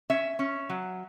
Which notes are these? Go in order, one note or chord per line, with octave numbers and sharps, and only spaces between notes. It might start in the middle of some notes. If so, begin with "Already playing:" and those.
C#4 E5
C#4
F#3